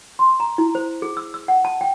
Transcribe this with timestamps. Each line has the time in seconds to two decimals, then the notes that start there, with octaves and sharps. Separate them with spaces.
0.19 C6
0.40 A#5
0.58 E4
0.75 C5
1.02 G#4
1.17 E6
1.34 E6
1.48 F#5
1.65 A5
1.81 G5